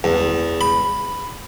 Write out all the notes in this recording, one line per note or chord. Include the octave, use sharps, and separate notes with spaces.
E2
B5